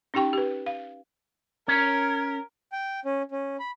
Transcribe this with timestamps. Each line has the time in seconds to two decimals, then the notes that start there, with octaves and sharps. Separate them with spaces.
0.14 C#4 D#4 G4 G5 C#6
0.33 G4 B4
0.66 F5
1.68 C#4 A#4 C#5
2.72 G5
3.05 C#4
3.31 C#4
3.59 B5